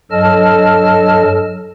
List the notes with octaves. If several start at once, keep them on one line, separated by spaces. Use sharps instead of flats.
G2 F#3 A4 D#5 A5 F6